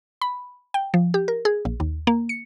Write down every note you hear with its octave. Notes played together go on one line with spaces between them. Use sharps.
B5
G5
F3
G4
A#4
G#4
A#1
D#2
A#3
C#7